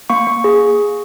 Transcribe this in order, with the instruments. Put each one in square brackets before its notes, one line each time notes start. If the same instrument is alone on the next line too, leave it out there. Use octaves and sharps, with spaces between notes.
[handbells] A#3 C#6
A#3
G#4